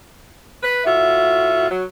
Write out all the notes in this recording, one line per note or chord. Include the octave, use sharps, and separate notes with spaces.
B4
A2 F4 F#4 E5
F#3